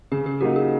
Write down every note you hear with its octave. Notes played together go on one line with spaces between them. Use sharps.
C#3 G#4
G#4
F#3 A#3 D#4 G4
G#4